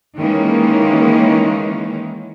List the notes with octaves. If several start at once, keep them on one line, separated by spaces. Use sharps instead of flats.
D#3 E3 G#3 A#3 C#4